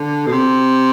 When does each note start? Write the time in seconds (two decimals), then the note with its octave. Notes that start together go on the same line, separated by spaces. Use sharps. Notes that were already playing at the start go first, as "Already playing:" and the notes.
Already playing: D3
0.26 B2
0.32 C3